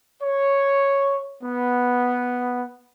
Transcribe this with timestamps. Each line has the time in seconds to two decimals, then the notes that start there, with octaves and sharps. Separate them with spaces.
0.21 C#5
1.42 B3